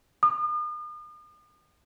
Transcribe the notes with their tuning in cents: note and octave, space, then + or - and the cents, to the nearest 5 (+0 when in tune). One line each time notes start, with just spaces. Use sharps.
D#6 -45